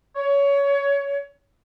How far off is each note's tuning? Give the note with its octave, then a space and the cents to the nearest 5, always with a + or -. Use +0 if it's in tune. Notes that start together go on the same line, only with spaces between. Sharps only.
C#5 +20